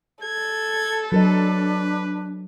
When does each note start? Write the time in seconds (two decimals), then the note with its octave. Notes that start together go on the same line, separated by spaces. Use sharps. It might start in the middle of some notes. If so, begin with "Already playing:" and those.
0.24 A4 G#6
1.12 F#3 D4 A#4 B4 D#5